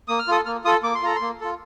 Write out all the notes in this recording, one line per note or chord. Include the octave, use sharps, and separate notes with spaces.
A#3 D#6
F6
F4 A4 D#6
A#3 F6
F4 A4 D#6
A#3 D6
C6
F4 A4 A#5
C6
A#3
F4 A4